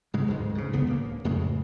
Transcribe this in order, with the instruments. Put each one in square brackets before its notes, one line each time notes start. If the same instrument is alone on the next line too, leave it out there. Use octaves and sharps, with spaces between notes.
[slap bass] G#2 C#3 G#3
D1 D2 G#2 G#3
G#2 C#3
F#1 C#2 B3
D1 A#3
F2 A2 C#3 G#3